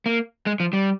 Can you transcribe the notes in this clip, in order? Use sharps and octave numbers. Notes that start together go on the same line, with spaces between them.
A#3
G#3
F3
G3